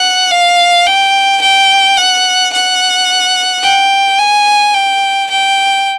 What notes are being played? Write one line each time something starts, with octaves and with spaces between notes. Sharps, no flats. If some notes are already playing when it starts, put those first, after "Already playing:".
Already playing: F#5
F5
G5
G5
F#5
F#5
G5
G#5
G5
G5